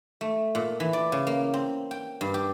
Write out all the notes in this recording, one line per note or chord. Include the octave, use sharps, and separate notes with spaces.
A3
A#2
E3
D5
C#3
A#3
C4
G5
G2
G4